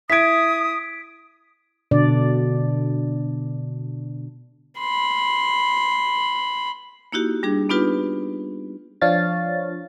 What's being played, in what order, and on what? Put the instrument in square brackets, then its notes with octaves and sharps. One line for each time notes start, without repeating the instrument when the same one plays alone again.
[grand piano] E4 G#6 [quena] D#6 [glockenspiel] B6 D7
[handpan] B2 D3 D4 D5
[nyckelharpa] B5 C6
[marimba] A#3 D#4 E4 F#4 G4
G3 D4 G#4
B3 D4 D#4 F4 G4 B4
[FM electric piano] F3 D4 C#5 F5 A6